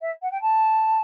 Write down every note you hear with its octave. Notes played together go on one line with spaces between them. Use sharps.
E5
F#5
G5
A5